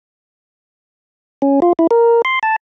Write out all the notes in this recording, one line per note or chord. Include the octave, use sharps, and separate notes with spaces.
C#4
F4
E4
A#4
C6
A5